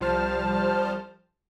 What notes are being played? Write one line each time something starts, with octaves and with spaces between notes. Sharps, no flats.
C2 F3 G3 C5 A5 F6